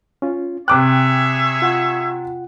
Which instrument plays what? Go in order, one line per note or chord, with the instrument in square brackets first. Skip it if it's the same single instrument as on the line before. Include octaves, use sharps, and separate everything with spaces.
[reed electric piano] C#4 F4
[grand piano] C3 D6 F#6 [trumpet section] G#4 C#5 E5 [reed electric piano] G5
[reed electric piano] F4 F#5